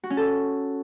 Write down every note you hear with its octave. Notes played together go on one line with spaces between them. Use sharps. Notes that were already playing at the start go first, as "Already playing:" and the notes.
F#4
C#4
A4